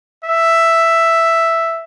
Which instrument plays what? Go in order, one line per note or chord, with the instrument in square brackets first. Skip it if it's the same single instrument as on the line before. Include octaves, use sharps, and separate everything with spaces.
[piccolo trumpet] E5